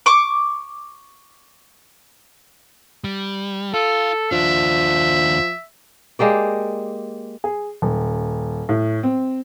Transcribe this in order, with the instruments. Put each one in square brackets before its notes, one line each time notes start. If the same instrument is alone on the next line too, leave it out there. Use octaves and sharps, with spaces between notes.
[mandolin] C#6 D6
[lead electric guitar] G3
[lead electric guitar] F4 [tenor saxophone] A4
[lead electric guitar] D#2 D4 [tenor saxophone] F3 [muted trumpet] E5
[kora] G#3 A#3 G4 D5
[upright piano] G#4
D#1
A2
C4